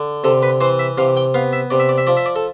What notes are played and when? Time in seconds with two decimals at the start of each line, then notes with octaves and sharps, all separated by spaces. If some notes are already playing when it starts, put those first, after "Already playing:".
Already playing: D3
0.24 C3 A4
0.43 B4
0.61 E3 C5
0.79 E5
0.98 C3 F5
1.17 G5
1.34 B3 F5
1.53 E5
1.71 C3 D5
1.80 E5
1.89 D5
1.98 E5
2.07 F3 D5
2.17 E5
2.26 D5
2.36 A4